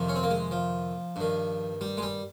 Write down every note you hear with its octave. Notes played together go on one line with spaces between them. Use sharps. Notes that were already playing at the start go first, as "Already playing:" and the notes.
Already playing: F2 C3 D#3
C#4
C4
A#3
G#3
F3
G2 D#3
G3
G#3
G3